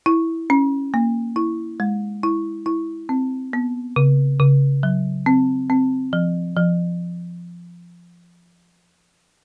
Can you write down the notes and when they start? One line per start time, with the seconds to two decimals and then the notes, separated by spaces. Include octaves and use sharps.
0.06 E4
0.50 C#4
0.94 A#3
1.36 E4
1.80 G#3
2.23 E4
2.66 E4
3.09 C4
3.53 B3
3.96 C#3
4.40 C#3
4.83 F#3
5.26 C4
5.70 C4
6.13 F3
6.56 F3